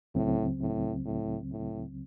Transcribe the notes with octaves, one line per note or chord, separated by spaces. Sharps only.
C#2 A2 C#3 F#3 C4
A2
A2
A2